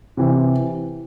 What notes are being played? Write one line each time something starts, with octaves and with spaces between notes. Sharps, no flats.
C3 E3